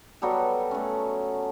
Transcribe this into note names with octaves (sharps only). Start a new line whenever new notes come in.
F#3 G3 B3 A4
A3 C#4